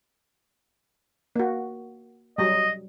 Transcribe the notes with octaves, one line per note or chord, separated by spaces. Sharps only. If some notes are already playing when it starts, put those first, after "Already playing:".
A#3 F#4
F#3 G3 D#5